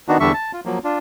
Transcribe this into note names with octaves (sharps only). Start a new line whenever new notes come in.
D#3 B3 D4 D#4 F#4
E2 D3 G3 D4 E5 C#6
A5
F4
F3 F#3 A#3
D4 F4